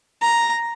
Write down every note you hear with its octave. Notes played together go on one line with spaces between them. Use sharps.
A#5